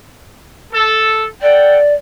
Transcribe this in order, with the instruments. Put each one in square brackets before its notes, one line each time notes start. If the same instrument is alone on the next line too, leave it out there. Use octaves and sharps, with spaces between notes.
[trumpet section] A4
[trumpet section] A4 F#5 G5 [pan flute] D5